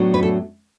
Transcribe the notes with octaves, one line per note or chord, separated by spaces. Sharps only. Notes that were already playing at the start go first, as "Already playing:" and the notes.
Already playing: A2 F#3 B3 D4
B4
A4